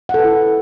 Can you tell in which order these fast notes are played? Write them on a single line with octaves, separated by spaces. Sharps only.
F#5 A4 B4 E4